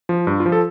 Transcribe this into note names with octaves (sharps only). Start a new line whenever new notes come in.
F3
G2
F4
F3
A4